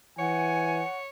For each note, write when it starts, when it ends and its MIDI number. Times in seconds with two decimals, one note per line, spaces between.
0.19 0.83 52
0.19 1.09 73
0.19 0.96 78
0.19 0.87 80